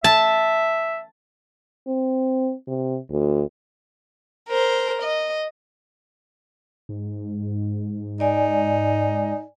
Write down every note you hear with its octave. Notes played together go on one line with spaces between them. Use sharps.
E5 A5
C4
C3
D2
A#4 C5
D#5
G#2
D#4 D5 G#5